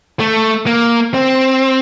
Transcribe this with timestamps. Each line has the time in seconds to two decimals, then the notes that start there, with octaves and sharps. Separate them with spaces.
0.20 A3
0.67 A#3
1.14 C4